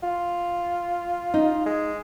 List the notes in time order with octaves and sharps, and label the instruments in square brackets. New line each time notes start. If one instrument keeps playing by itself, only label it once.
[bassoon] F4
[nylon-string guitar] D#4
[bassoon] G#3